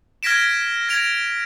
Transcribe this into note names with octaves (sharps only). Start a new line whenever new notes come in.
F6 G#6 A#6 B6 D7 E7
G#6 A#6 D7 F7